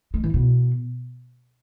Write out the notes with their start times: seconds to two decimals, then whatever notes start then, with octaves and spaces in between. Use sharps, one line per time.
0.14 G#3
0.24 E3
0.34 B2